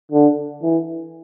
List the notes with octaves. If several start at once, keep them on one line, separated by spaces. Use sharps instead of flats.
D3
E3